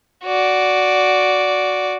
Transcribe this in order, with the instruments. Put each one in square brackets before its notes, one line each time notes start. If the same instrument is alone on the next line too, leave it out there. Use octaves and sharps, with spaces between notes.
[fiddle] F#4 D5